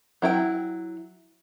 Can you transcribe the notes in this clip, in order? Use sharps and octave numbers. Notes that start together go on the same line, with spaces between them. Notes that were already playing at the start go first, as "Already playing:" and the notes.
F#3 E4 A4 G5